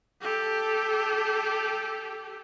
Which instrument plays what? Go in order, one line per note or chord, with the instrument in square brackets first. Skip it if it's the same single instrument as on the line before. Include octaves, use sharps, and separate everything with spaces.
[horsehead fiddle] G4 A4